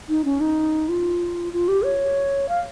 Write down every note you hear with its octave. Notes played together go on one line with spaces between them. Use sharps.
D#4
C#4
D#4
F4
F4
G4
C#5
F5